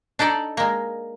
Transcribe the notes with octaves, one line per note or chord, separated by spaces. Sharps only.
D4 D#4 A4 D5
G#3 A#3